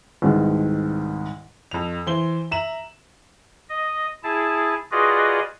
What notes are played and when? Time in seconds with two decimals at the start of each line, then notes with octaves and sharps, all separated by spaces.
0.22 C2 G#2 B2 D#3
1.71 F2 F7
2.07 E3 C5 G7
2.51 E5 A#5 E7 F#7
3.69 D#5
4.24 E4 G#4 A5
4.92 F4 F#4 G#4 B4 D5 D#5